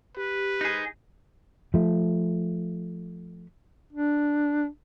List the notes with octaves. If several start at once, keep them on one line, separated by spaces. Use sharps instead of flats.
G4 B4
D#4 G#4
F3 A3
D4